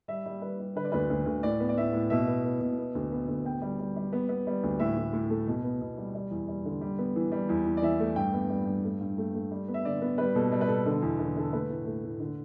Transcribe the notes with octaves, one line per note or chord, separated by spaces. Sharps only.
G3 E5
G3
G3 B4
G3
D3 B4
D5
D2 B4
D2
D2
A2 D5
B3
D5
A2 E5
A2
B2 E5
B3
B3
B2
B3
D2
B3
D2
B3 G5
G3
G3
G3
B3
B3
G3
D2
A2 E5
A2
A2
A3
B2
B3
B2
G3
G3
E2
G3
D3
G3
B3
E3
G3
E2
E3
D5
E3 E5
A3
G2 G5
B3
G3
G2
A3
G2
A3
A3
G3
B3
E5
D3 D5
B3
G3 B4
B2 A4
G3
B4
B2 A4
D3
E2
D3
D3 A4
A3 B4
A2
A3
A2
D3